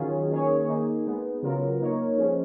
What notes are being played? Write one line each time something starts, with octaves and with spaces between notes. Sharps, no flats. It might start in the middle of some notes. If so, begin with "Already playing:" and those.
Already playing: D#3 F#3 C#4 F4 G#4
D#3 A#3 C#4 G#4 C#5
A#3 D#4 G#4
G#3 B3 D#4
C#3 F#3 B3 F4 A#4
A#3 D#4 A#4 C#5
F3 G#3 C#4